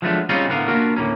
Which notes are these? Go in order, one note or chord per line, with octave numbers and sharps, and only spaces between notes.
F3 F#3 G#3 A3 B3 D4
G3 C4 C#4 D#4 F4 G#4
A2 D3 B3 A#4 F5
A#3 B3 D4 F4 F#4 A#4
D2 A2 A#3 C#4